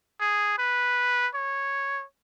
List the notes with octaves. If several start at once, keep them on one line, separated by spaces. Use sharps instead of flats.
G#4
B4
C#5